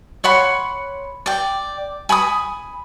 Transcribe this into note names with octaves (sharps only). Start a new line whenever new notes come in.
C#5 F#5 B5 C6
D5 G5
G#5 B5 C#6 D#6